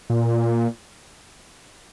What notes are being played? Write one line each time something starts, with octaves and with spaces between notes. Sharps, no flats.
A#2